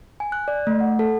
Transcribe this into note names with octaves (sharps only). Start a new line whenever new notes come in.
G#5
F#6
D5
A3
F#5
A4